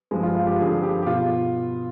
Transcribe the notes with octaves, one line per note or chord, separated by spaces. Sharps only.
G2 F3 G#3
F4
F4
G4
G2 D3 F3 G#4
G4
G4
B2 F4